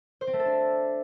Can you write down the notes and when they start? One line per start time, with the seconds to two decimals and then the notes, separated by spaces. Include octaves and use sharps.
0.21 C5
0.27 C4
0.33 A3
0.39 A4
0.46 D4